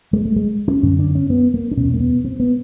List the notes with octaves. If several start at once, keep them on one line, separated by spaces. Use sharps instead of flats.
G#3
A3
G#3
C#4
F#2 D3 C#4
D4
C#4
B3
A#3
D4
E2 B2 C#4
A#3
B3
C4
B3